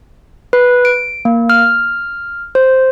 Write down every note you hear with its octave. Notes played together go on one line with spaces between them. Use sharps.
B4
D7
A#3
F6
C5